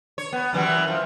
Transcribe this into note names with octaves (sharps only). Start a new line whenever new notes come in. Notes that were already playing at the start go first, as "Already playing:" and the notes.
C#5
B3
F#2 E3 G3
F3